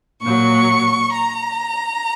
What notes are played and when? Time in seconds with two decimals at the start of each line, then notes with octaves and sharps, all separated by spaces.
0.22 A#2 F#3 C#6
1.13 A#5